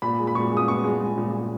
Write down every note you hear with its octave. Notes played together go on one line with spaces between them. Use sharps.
A#2 B5
G#3
B5
A#2 C#6
G#3
D#6
B3 C#6
G#3
G#3
A#2
A#2